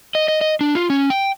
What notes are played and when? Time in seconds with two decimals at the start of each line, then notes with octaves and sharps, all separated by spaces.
0.15 D#5
0.28 D#5
0.41 D#5
0.61 D4
0.75 F4
0.90 C#4
1.10 G5